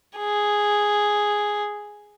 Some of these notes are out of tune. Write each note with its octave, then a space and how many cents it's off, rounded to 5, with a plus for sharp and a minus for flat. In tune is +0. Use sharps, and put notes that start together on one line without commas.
G#4 +0